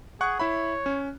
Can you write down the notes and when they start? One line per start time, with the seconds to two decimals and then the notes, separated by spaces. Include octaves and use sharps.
0.21 G#4 F#5 C#6 F#6
0.40 E4 C#5 E5 B5
0.86 C#4